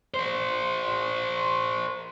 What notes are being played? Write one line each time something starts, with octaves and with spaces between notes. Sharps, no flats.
A#4 C5